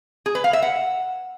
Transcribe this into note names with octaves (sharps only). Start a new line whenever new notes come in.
G#4
B4
F5
E5
F#5